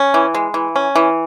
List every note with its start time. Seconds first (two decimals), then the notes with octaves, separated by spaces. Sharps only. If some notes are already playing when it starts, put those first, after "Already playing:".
Already playing: C#4
0.14 E3
0.34 G#3
0.54 E3
0.76 C#4
0.96 E3